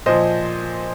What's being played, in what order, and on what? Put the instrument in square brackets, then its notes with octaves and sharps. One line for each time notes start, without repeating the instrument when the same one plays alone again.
[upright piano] A#2 F3 C5 D#5